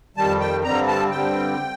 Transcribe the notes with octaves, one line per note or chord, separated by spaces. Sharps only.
F2 D#3 G3 A5
G5
G2 D3 G3 C4 A#5
A5
G2 D3 G3 C4 G5